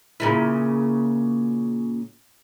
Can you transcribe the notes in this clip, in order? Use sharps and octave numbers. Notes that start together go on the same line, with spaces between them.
A#2 C#3 E4